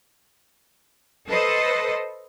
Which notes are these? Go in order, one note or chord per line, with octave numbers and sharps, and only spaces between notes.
A4 B4 C5 D#5